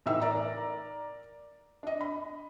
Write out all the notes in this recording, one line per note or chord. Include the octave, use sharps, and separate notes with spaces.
A2 E3 D#4 E5 E6
A#4 D5 A#5
D4 D#5
B5